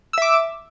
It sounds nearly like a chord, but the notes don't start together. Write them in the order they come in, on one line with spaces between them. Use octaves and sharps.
E6 E5 D6